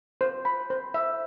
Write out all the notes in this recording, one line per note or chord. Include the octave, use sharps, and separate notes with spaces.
C5
B5
C5
E5